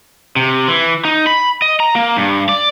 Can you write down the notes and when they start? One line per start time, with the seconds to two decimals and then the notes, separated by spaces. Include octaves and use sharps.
0.36 C3
0.68 E3
1.05 D#4
1.27 B5
1.62 D#5
1.80 A#5
1.96 A#3
2.16 G2
2.49 D5